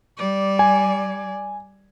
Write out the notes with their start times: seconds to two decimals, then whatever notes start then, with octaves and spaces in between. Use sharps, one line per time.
0.17 G3 D5
0.59 G#5